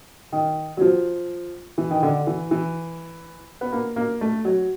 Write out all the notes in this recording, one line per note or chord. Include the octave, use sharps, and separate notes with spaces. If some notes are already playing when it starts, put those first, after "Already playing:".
D#3
F#3
F3
E3
D#3
D3
E3
E3
B3
A#3
A#3
A3
F#3